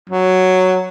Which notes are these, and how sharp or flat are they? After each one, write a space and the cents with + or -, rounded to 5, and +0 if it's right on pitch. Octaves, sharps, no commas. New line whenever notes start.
F#3 +0